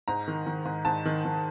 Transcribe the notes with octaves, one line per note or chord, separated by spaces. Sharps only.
G#2 A#5
D#3
D#3
G#2
G#2 A5
D#3
D#3